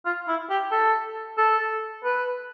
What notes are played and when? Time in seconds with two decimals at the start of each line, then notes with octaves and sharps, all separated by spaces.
0.05 F4
0.28 E4
0.50 G4
0.72 A4
1.38 A4
2.04 B4